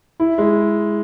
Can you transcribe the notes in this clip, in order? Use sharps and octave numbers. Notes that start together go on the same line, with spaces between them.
E4
G#3